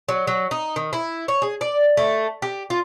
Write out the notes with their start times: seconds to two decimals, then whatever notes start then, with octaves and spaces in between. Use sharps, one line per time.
0.09 F#3
0.27 F#3
0.51 D#4
0.76 D#3
0.93 E4
1.28 C#5
1.42 G#4
1.61 D5
1.97 A3
2.42 G4
2.70 F4